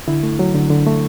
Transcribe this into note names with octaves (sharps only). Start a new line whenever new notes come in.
D3 E4
A3
F#3
D3
D3
A3